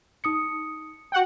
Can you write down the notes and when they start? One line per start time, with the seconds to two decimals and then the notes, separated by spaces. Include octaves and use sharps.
0.24 D#4 D#6 C#7
1.12 F#4 F#5 G5